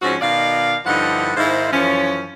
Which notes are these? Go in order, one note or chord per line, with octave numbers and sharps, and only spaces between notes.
G#2 F3 C4 C#4 F#4
B2 D#3 D5 F5
G2 D3 F3 D#4 E4 F#5
G#2 D#3 G#3 E4 C5 F5
F#2 E3 F3 C#4